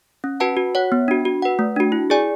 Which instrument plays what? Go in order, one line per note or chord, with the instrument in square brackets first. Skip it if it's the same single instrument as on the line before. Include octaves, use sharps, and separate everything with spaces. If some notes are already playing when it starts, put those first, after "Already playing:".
[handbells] C#4
F#4 B4 F#5 A5
F#4
C#5 F#5
B3
D4 F#4
F#4
B4 F#5
A3
D4 F#4
E4
G#4 D5 G#5